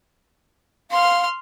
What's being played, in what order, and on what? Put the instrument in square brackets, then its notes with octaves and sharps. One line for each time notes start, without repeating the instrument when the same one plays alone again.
[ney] F5 [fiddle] C6 F6